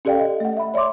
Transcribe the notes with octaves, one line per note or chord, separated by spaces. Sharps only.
C#4 G4 A4 D5 F5 G5
D#5
A3 F#5
E5 B5
C#5 D5 E5 C6 D6